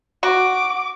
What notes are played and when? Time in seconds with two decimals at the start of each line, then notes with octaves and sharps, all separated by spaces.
0.23 F#4 D6